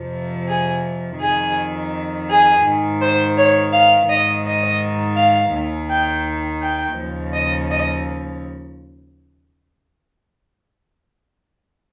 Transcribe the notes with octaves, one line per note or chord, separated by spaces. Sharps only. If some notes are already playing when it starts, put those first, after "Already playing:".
Already playing: F2 C3 F3
G#4
F2 D#3 G#4
G#4
G#2 D#3
C5
C#5
F5
G#2 D#3 D#5
D#5
F5
D#2 D#3
G5
G5
D#2 C#3 F3
D#5
D#5